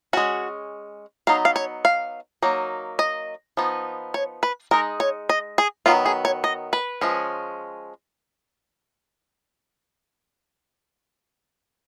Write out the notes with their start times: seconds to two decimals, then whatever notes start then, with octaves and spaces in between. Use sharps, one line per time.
0.13 G#3 C#4 F#4
1.27 F#3 B3 D#4 F5
1.45 F5
1.56 C#5
1.85 F5
2.42 F#3 A#3 D#4
2.99 D#5
3.57 F3 B3 D#4
4.14 C#5
4.43 B4
4.71 G#3 D#4 A#4
5.00 C#5
5.29 D#5
5.58 G#4
5.86 D#3 F#3 B3 F4
6.06 G#4
6.25 C#5
6.44 D#5
6.73 B4
7.01 F3 G#3 C#4